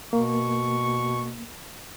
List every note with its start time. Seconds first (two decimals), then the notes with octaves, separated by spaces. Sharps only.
0.13 B2 A#3 C#6